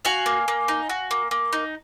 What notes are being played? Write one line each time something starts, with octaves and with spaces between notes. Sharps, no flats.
F#4 F5 G#5
A#3
A#3
D#4
F#4
A#3
A#3
D#4